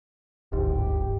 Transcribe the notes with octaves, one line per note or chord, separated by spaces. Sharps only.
D1 G1 G#2 G4